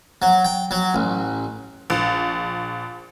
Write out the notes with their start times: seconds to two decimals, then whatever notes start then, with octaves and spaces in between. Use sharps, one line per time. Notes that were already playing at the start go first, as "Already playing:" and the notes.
0.22 F#3
0.45 G5
0.71 F#3
0.94 A1
1.90 A#1